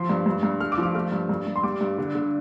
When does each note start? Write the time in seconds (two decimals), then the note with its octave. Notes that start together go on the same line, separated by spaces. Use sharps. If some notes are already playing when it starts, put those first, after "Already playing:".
Already playing: F3 C6
0.09 G2
0.26 G2
0.43 G2
0.60 A3 F6
0.72 D6
0.78 F3
0.83 F6
0.95 A3 F6
1.12 G2
1.29 G2
1.47 G2
1.56 C6
1.63 G3 D6
1.81 G2
1.98 D3
2.15 D3